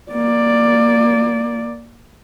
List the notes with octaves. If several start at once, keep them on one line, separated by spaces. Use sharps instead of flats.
A#3 D5